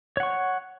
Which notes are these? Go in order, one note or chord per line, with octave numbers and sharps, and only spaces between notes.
C#5 F#5 C#6